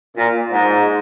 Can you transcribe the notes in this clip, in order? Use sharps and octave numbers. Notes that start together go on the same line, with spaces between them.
A#2
G#2